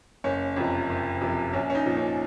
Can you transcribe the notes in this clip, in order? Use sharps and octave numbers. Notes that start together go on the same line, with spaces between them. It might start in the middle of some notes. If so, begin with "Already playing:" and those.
F#1 C#4
F2 C3 F3
F#1
F2 C3 F3
A#1 C#4
C#4
D#4
A#2 F3
C#4